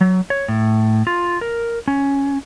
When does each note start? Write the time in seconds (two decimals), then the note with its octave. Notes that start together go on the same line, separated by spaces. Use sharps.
0.01 F#3
0.30 C#5
0.48 A2
1.07 F4
1.41 A#4
1.88 C#4